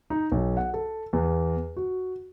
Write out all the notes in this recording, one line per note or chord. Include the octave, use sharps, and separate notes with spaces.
D#4
B1
F#5
A4
E2
F#4